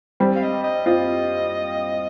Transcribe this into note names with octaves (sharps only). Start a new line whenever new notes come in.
G3 C4
F5
D#5
D#5
C4 F4 D#5